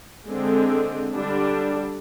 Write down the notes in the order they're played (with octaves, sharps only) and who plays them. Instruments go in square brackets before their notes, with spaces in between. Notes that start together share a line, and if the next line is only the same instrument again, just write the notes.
[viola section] D3 G#3 C4
D3 G3 D4